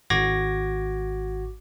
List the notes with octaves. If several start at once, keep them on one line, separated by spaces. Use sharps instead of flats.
G#1 F#4 D6 G#6 A#6